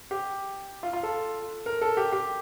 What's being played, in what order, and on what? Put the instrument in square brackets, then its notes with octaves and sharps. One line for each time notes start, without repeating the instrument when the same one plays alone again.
[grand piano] G4
F4
F4
A4
A#4
A4
G4
G4